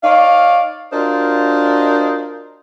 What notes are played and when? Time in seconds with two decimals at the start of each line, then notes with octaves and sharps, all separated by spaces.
0.03 D#4 C#5 D5 F5
0.92 D4 F4 F#4 A#4 C5 D#5